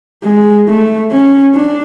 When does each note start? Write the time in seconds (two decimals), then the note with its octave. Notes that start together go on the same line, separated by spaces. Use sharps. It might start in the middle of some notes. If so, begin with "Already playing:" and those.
0.23 G#3
0.68 A3
1.12 C#4
1.55 D4